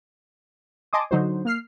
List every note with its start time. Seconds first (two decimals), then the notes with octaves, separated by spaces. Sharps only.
0.93 D#5 G#5 A5 C6 D6 D#6
1.11 D3 F#3 D#4 F#4 C5
1.45 A#3 F6 C7